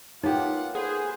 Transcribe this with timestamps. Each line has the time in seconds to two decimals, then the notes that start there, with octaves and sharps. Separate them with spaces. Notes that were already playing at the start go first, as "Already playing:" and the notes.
0.23 A#3 B3 D#4 F4 G4 C#5 F#5
0.75 G#4 A4 B4 C5 F#5